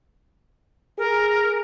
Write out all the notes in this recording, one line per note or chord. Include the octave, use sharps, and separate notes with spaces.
G#4 A#4